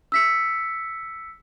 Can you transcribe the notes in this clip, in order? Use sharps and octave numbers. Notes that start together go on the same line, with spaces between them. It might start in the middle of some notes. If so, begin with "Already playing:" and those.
E6 B6 C#7